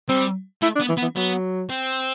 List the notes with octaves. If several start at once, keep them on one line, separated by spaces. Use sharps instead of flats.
G3 C4
A3 E4
D4
B3
E3
B3
E3
F#3 B3
C4